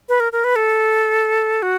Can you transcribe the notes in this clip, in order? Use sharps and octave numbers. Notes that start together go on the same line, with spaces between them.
B4
A#4
A#4
B4
A4
F#4